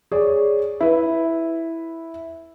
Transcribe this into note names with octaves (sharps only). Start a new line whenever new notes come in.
G#4 C#5 D5
E4 B4